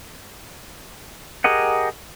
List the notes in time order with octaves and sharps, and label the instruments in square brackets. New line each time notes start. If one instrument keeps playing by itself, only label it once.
[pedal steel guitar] G4 G#4 A#4 D#5 F#5